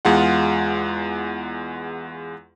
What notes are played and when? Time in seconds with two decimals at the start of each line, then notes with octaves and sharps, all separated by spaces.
0.05 E2 G#3 F4 F#5